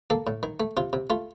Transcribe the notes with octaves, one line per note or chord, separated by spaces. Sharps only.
A#3 A4
A2
D#3
A3
C3 F4
C3
A3 F4